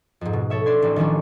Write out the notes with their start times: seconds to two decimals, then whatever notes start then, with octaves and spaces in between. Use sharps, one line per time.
0.21 F2 G#2
0.33 B2
0.50 A4 C#5 E5
0.66 D4 D5 C6 G#6
0.82 A1 C4
0.96 D#3 F3 G3 C#4 D4